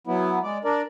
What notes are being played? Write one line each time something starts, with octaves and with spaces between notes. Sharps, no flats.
F#3 B3 E4
G#3 D5
D4 A#4 D5